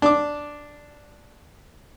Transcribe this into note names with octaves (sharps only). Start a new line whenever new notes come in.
D4 D6